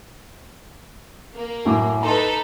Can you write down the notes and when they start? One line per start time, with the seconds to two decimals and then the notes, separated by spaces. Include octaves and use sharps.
1.34 A#3
1.65 F#2 A2 D6
2.03 D#4 A4 B4 A#5 C6